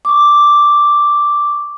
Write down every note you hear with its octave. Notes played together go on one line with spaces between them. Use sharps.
C#6 D6